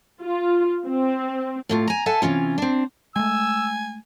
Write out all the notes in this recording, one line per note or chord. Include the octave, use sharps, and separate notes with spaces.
F4
C4
A2 A3 F4
G#5 A#5
A4 E5 F#5 G#5 A5
C3 E3 C#4 F4
C4 D4
G#3 A3 G#5 E6